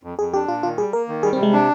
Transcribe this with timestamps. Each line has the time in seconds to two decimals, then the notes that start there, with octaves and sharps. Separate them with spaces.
0.03 F2
0.18 F2 G#4
0.34 D4 G4
0.48 A#2 F4
0.63 D#3 F4
0.78 G3 G#4
0.93 A#3 A#4
1.08 D#3
1.23 G3 G#4
1.33 C4
1.38 C3 G#3
1.53 D4